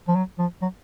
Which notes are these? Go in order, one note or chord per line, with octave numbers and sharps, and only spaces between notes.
F3
F#3
F3
F#3